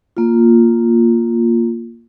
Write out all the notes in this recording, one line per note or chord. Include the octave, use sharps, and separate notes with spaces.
A#3 F4